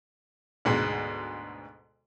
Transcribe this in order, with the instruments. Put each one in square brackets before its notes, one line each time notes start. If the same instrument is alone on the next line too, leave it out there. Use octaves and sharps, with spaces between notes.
[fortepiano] D2 G#2 B2